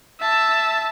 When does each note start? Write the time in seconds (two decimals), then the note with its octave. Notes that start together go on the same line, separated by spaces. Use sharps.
0.20 E5 A5